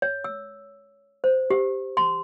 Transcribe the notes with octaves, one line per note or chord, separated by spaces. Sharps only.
C#5
E6
C5
G4
C6